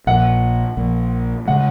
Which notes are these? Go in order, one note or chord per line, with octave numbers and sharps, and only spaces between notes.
A#1 A#2 F3 F#5
A#1 A#2 F3
C#3 G#3 F#5